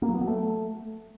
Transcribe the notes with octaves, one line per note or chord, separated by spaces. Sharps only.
A#3
F#3
B3
F#3
A3